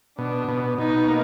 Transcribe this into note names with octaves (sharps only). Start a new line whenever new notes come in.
B2 D4
B2
B2 D#4
A#3